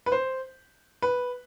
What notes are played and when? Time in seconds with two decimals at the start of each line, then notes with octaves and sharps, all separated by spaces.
0.06 B4
0.12 C5
1.02 B4